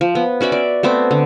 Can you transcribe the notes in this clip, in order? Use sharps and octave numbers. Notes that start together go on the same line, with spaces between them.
F3
B3
C#4 F#4 D5 E5
D5
A3 B3 C4 D6
D3